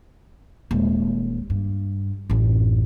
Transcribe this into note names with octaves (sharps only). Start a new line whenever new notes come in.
D#1 G#3
G2
A1 F#2